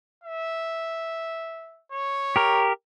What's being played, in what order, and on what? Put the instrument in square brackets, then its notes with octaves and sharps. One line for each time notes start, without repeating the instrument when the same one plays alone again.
[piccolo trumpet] E5
C#5
[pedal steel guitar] G4 A#4